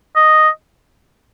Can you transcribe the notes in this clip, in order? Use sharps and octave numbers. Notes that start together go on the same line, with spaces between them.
D#5